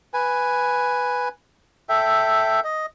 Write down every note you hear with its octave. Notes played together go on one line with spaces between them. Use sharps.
B4 G#5
A4 E5 G5
D#5